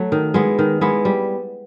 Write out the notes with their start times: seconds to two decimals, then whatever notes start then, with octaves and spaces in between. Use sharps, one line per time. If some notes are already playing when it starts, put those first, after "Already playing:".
Already playing: F#3 A3
0.12 D#3
0.34 G#3 B3 E4
0.59 D#3
0.81 G#3 B3 E4
1.05 G3